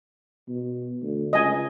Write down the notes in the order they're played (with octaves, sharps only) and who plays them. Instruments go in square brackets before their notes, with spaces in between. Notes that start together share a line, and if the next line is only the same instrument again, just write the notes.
[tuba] B2
D2
[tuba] C#2 [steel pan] D#5 G#5